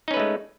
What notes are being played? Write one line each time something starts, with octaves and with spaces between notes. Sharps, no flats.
G#3 A3 C#4 D#4 B4